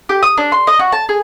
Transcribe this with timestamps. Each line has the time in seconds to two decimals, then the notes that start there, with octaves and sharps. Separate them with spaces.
0.09 G4
0.23 D#6
0.37 D4
0.52 C6
0.67 D#5
0.79 F#4
0.92 A5
1.09 G#4